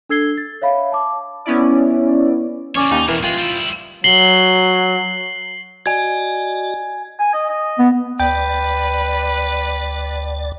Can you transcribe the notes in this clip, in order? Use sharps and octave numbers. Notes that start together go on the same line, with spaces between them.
D4 A4 E6 G#6 C7 G7
A6
C#5 E5 F5 B5
A5 D6
B3 C#4 E4 D5
A#3 C#4 C#5 D5
D#2 D#4
E2 B2 E3 A#4
G#3 F4 G5
G3 E4
F#3 C7 F#7 G7
F#4 D5 D#5 G#5 G#6
G#5
D#5
D#5
B3
D2 B4 D5 G5